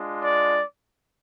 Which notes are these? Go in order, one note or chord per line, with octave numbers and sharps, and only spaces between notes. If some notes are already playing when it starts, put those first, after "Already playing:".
Already playing: G#3 D4 F4
D5